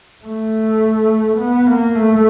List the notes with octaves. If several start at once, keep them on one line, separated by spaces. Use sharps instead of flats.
A3
B3
A#3
A3